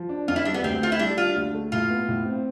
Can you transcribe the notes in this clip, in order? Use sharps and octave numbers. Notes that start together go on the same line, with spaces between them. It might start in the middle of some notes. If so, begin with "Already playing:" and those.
Already playing: F3
D4
F2 F4
E4
G3 D4
B3
D2 C4
A3 F4
E4
G3 D4
D4 F4
D2
A3
A2 F4
B3
A2
C4